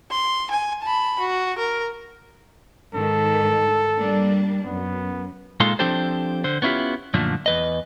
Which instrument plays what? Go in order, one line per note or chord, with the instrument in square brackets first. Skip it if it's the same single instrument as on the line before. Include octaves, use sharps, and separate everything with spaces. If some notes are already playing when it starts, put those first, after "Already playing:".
[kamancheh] C6
G#5
A5 B5
F#4
A#4
[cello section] G#2 D#3 [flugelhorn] A4
[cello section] G3 A#3 D4
[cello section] F#2 [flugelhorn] B3
[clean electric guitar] A#2 G#3 D#4 F4 A4 C6
F3 C4 D4 G4 A4 C5
D3 C5
B3 C#4 E4 F4 G4
F#2 A#2 D3 F3 A3
E2 B4 D#5